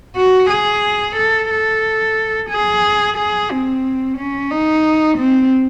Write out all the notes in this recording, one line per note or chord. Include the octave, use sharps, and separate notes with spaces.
F#4
G#4
A4
A4
G#4
G#4
C4
C#4
D#4
C4